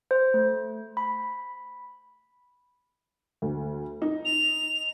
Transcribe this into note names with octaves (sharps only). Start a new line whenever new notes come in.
C5
A3
B5
D2
D#4
F7